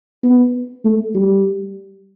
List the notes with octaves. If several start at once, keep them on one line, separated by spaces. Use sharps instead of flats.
B3
A3
G3